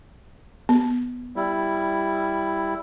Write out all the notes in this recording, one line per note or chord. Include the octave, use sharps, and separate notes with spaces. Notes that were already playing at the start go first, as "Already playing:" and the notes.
B3
G3 E4